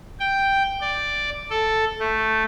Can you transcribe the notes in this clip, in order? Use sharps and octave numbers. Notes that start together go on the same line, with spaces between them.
G5
D5
A4
A3